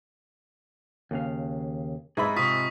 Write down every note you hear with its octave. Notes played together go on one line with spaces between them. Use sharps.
D#2 C#3 F5
G#2 G#4 E5 B5
C3 F4 C#6 D#6 B6